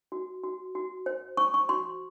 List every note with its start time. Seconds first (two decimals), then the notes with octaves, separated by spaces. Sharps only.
0.12 F#4
0.43 F#4
0.75 F#4
1.06 C5
1.37 C5 C#6
1.54 C#6
1.69 F#4 C6